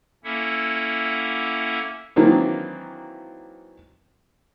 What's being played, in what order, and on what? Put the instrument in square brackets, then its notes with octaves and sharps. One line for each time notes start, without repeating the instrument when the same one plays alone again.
[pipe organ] A#3 C#4 E4 A4 E5 F#5
[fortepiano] D#3 E3 F#3 A#3 C4 D4